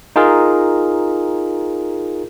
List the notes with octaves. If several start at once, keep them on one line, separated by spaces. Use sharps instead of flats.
D#4 F4 G#4 A#4